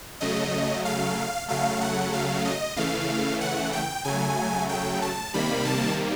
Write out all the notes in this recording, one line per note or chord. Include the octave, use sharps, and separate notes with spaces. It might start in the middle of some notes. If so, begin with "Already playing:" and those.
C#3 F#3 A3 D#5
F5
C#3 F#3 A3 F5
F#5
F5
D#5
C#3 E3 A3 F5
F#5
G5
C#3 F#3 A3 G#5
G5
A5
C3 D#3 G3 A#3 B5
A5